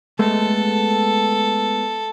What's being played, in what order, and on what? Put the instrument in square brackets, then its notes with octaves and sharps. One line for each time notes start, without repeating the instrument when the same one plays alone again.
[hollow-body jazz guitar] G#3 A3 B3 [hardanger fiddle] A4